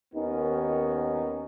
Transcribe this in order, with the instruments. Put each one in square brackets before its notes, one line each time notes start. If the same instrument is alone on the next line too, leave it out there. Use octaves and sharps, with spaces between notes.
[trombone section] D#2 D#3 B3 C#4 D#4